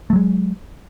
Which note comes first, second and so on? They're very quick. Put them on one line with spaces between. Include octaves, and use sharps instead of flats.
A3 F#3 G#3